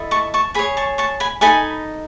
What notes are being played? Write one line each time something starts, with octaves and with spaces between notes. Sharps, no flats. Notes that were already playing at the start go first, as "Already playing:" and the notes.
Already playing: E4 A4 D#5
A5 C#6
A5 C#6
G#4 C#5 G#5 B5
A5 C#6
A5 C#6
G#5 B5
D#4 A4 D#5 G#5 B5